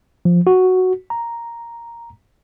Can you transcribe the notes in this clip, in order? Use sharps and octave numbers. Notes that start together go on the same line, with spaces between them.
F3
F#4
A#5